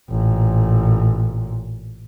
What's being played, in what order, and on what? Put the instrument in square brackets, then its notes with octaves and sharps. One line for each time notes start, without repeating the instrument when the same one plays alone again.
[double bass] A1 A#2